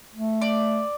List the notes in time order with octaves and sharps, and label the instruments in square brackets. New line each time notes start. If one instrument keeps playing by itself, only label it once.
[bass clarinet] A3
[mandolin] D5